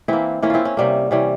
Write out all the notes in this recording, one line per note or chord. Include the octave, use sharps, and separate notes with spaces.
E3 A#3 C4 E4
E3 A#3 C#4
C4 E4 F4
C#4
C3 G3 A#3
C3 E3 G3 C#4